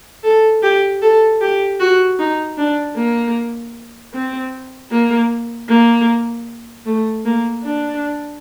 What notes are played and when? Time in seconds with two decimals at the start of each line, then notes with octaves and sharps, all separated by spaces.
0.24 A4
0.63 G4
1.02 A4
1.41 G4
1.80 F#4
2.19 D#4
2.58 D4
2.96 A#3
4.13 C4
4.91 A#3
5.69 A#3
6.86 A3
7.25 A#3
7.64 D4